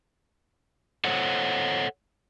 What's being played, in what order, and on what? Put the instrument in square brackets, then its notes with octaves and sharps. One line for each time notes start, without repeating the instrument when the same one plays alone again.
[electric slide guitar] A4 C5 C#5 F#5